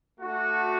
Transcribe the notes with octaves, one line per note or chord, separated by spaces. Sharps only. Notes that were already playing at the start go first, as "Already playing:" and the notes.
A3 D4 F#4